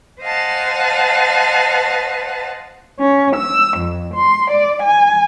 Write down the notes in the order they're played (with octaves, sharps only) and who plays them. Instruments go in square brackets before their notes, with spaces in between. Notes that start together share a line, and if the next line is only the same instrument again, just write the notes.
[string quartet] C5 D#5 F5 F#5 G#5 A5
C#4
E6
F2
C6
D5
G#5